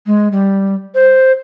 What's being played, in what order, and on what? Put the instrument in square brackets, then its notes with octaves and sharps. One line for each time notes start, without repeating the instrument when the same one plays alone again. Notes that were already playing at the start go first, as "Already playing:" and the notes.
[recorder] G#3
G3
C5